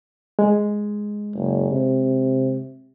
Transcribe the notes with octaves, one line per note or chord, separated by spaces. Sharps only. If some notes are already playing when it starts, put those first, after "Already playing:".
G#3
F#1
C3